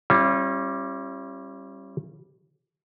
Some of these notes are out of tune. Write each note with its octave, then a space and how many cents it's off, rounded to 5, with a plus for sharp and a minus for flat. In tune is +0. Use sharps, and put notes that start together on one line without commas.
G3 -5 C#4 -35 E4 +45